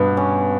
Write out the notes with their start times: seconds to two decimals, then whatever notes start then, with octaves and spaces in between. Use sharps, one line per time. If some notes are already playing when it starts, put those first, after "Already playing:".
Already playing: G2 B2 B3
0.17 C#4